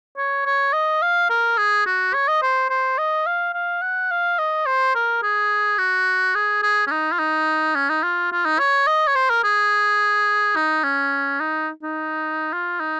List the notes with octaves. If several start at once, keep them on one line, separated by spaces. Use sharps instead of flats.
C#5
C#5
D#5
F5
A#4
G#4
F#4
C#5
D#5
C5
C5
D#5
F5
F5
F#5
F5
D#5
C5
A#4
G#4
F#4
G#4
G#4
C#4
D#4
F4
D#4
C#4
D#4
F4
F4
D#4
C#5
D#5
C#5
C5
A#4
G#4
D#4
C#4
D#4
D#4
F4
D#4